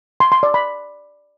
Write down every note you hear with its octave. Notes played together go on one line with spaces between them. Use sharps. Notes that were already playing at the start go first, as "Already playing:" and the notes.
C6
C6
D5
B5